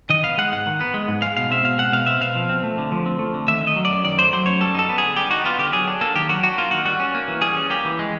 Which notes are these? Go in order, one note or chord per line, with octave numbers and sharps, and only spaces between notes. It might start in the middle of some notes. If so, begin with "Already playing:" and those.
D#3 D#5
B3 F5
G#3 F#5
G#2 F#5
D#3
B3
G#3
G#2
G#3 F5
B2 F5
C4 E5
B2 F5
G#3 F#5
B2 F5
C4 E5
B2 F5
F3
C4
A3
D3
F3
C4
A3
D3
D#3 E5
A3
D#5
F#3
F#2 D5
D#3 D5
A3 C5
F#3 C5
F#2 C#5
G3 A4
D#4 A4
B3
D3 G#4
G3 G4
D#4 F#4
B3 F4
D3 G4
F#3 G#4
D4
A#3 A4
D#3 G4
F#3 F#4
D4 F#4
A#3 F4
D#3 F#4
G3 F#4
C#4
A#3
E3
G3 G#4
C#4
A#3 G4
E3
G#3